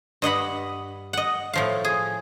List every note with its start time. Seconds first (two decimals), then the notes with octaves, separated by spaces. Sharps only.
0.22 G2 D#5 F#5 B5
1.13 D#5 F#5
1.53 A2 F3 F5
1.85 G#4